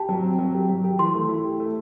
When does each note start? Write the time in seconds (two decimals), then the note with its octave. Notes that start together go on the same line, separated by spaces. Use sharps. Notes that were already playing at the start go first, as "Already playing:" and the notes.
Already playing: G4 A5
0.09 F#3
0.24 C4
0.39 F#3
0.54 G4
0.69 F#3
0.84 G4
0.99 E3 C6
1.14 A3
1.29 E4
1.44 G4
1.60 A3